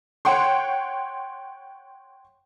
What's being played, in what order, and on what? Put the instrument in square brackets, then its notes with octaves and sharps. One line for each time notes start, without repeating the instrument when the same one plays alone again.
[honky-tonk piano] C#5 F#5 G5 C6